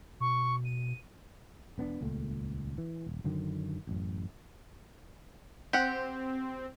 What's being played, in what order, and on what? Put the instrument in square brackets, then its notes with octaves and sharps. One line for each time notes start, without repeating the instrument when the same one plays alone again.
[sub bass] B2 [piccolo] C#6
[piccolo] D#7
[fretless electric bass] E1 B3 C#4 D4
D#1 C#2 A#2 A3
E3
D#1
F#2 D3 D#3 F#3
A1 F#2
[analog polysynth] C4 [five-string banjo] G4 F#5